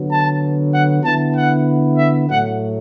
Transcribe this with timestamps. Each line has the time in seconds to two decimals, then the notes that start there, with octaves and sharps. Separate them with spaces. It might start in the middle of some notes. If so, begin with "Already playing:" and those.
Already playing: D3 F#3 B3
0.10 A5
0.72 F#5
1.04 D3 B3 E4 A5
1.35 F#5
1.98 E5
2.29 A2 F#3 A3 F#5